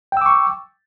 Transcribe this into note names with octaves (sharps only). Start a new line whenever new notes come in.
G5 C#6 D6 E6